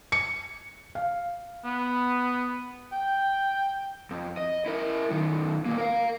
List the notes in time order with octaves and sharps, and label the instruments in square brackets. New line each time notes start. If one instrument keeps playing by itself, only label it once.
[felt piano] C#7
F5
[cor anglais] B3
G5
[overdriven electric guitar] F2
D#5
E4 A#4
B1 D#3
B2 A#3
A#4 F5